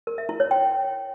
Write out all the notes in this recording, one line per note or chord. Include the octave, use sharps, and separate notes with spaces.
A#4
E5
E4
C#5
G5